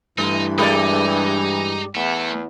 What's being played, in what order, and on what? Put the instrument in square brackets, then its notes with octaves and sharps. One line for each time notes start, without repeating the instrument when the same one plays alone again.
[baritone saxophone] G2 [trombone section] E3 [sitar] A3 E4 [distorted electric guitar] D#4
[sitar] G#3 G4 D5 [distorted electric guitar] D#4
[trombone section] E2 [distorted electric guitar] A3